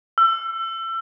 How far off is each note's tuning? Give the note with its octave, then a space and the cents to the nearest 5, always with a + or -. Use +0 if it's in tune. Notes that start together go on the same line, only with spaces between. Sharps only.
E6 +30